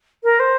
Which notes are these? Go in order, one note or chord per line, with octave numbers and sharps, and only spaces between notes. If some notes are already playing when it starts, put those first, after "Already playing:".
A#4
C5